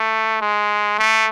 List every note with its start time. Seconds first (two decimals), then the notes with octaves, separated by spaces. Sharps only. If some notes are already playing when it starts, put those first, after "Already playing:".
Already playing: A3
0.41 G#3
0.99 A3